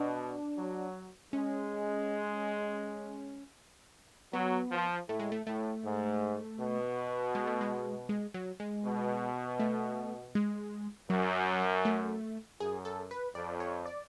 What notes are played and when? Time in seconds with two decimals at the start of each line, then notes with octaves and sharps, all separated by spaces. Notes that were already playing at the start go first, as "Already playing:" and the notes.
Already playing: B2 D4
0.58 F#3
1.33 G#3 C#4
4.33 F#3 B3
4.72 F3
5.09 A2 A3
5.20 G#3
5.32 A3
5.47 A2 A3
5.84 G#2
6.59 B2
7.35 G#3
7.47 A3
7.61 G#3
8.09 G#3
8.34 F#3
8.60 G#3
8.84 B2
9.60 A3
10.35 G#3
11.10 F#2 F#3
11.85 A3
12.60 F#2 G#4
12.85 A4
13.11 B4
13.35 F2 D5
13.60 C#5
13.85 D5